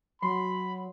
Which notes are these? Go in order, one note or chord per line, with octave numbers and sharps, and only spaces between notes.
F#3 B5 C6